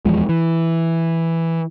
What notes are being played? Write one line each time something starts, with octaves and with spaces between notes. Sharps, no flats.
D#1 E2 F3 G#3
E3